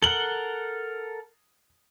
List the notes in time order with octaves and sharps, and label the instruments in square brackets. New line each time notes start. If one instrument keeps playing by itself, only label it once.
[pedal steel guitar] A4 A#4 F#5 [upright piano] F#7 G7